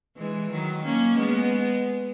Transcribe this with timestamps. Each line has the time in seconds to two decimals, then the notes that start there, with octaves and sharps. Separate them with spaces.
0.17 E3 G#3
0.51 D#3 F#3
0.84 A#3 C#4
1.18 G#3 B3